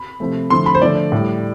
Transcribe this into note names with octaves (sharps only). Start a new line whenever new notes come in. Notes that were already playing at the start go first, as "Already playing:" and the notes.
Already playing: B5
C3 F3 A3
D3 F3 A3 C6
B5
C5
D3 F3 A3 D5
A2 G3